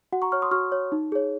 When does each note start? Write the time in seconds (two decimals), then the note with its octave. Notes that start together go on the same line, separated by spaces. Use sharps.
0.12 F#4 F#5
0.22 A#5 C#6
0.32 C#5 C#6 F6
0.42 C6 D#6
0.51 F#4 C#6 F6
0.72 C#5
0.92 D#4
1.12 G#4 C#5